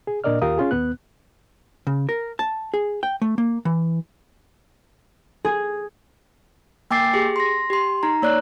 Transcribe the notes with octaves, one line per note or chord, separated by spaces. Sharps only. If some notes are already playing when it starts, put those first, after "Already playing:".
G#4
A#2 D4 A#4 D5 D#5 F6
D#2 F4 G4 A#4 F5 D#6
C#4 F4 G#4
D#2 B3 F#6
C#3
A#4
A5
G#4
G5
A3
A#3
E3
G#4
A#3 G5 G#5 D6 A6 C7
G4 G#4
C6 A#6
G4 C6
D#4 A#5
A#3 C#5 D5 F#6